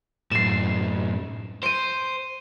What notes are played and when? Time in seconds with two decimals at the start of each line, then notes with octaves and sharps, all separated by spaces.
0.31 F#2 A2 C7 E7
1.63 C5 D7 D#7